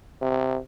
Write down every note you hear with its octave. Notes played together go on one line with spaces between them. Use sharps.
C3